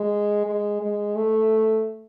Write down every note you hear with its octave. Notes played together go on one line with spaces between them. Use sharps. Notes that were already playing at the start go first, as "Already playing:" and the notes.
Already playing: G#3
G#3
G#3
A3